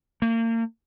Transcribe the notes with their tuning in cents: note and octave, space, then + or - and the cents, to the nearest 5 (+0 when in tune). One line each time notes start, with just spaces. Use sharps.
A#3 -35